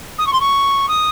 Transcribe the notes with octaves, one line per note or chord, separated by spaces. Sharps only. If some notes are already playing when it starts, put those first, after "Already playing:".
D#6
C#6
C6
C#6
D#6